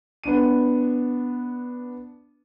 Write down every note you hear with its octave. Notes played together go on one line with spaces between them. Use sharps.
B3 D4 D#7